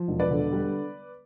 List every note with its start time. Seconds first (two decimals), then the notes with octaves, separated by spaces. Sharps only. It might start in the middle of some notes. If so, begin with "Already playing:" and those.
Already playing: F3
0.08 E1
0.20 B4 D5
0.31 D3
0.52 G3